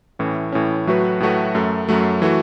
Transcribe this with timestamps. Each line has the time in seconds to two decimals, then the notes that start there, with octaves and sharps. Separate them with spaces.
0.19 A2 E3 C#4
0.52 A2 E3 C#4
0.87 A2 F#3 A3 F#4 B4
1.20 A2 F#3 A3 F#4 B4
1.55 F#2 F#3 A3
1.89 F#2 F#3 A3
2.22 E3 A3 F#4